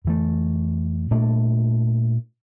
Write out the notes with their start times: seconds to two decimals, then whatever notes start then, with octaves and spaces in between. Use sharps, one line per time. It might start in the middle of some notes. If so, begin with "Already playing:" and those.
0.05 F2 E3 A3
1.11 A#2 A3 D4